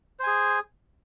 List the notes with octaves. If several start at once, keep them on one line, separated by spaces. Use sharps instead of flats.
G#4 C5 G#5